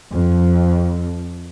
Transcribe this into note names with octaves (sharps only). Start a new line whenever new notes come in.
F2